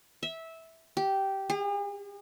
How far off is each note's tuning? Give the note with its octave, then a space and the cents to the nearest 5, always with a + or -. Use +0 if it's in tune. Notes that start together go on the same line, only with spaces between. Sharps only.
E5 -15
G4 -10
G#4 -45